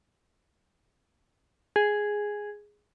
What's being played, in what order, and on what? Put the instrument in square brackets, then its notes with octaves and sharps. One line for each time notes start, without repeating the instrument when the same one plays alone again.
[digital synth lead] G#4